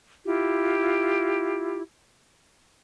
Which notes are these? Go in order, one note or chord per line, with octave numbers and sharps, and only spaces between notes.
E4 F4 G4